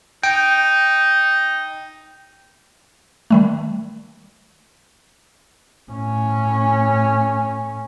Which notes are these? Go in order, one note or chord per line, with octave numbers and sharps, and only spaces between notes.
D#4 G5
D#3 G3 A3
A2 C#4